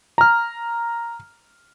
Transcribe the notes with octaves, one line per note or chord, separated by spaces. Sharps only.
A#5 F6